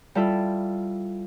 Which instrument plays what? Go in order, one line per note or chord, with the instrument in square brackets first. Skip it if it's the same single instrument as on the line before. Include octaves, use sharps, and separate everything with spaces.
[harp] G3 E4 F4 A4 E5